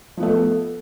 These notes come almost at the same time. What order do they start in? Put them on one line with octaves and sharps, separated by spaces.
F3 B3 A3